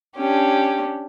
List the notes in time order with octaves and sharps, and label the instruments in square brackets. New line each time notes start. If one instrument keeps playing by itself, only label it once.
[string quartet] C#4 D4 G4